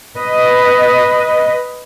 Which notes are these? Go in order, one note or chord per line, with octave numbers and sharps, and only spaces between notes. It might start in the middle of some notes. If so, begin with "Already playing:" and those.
B4 D#5